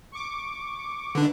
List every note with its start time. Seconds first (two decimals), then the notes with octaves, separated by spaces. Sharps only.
0.12 C#6 D6
1.15 D3 D4 B4